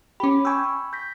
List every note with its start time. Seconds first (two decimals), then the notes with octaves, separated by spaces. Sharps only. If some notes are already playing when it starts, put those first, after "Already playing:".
0.20 C#4 G4 B5 D6
0.45 G5 G#5 B5 C#6 E6
0.93 G6 A#6 B6